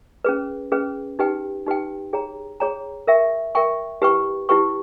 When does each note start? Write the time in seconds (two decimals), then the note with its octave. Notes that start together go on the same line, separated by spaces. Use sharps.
0.24 C#4 G#4 B4
0.72 C#4 G#4 B4
1.19 D#4 G4 B4 G5
1.66 D#4 G4 B4 G5
2.13 G#4 C#5 G5 A#5
2.60 G#4 C#5 G5 A#5
3.07 A#4 E5 G5 C#6
3.55 A#4 E5 G5 C#6
4.02 E4 G4 B4 G5 C#6
4.49 E4 G4 B4 G5 C#6